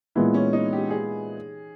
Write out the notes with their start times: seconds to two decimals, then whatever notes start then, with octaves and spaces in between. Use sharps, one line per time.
0.15 A#2 E3 G#3 B3 E4
0.34 C#4
0.53 D#4
0.73 G4
0.90 G#4